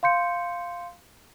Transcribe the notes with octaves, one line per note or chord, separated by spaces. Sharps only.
F5 C6 G6 C#7